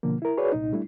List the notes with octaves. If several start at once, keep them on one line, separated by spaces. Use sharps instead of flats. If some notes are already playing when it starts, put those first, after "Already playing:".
B2 D3 F3 A#3
E4 A#4
F#4 G#4 B4 C#5 D5
C2 A#2 D#4
G3 A3 D4 E4